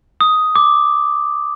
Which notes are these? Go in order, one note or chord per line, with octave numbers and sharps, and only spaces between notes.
D#6
D6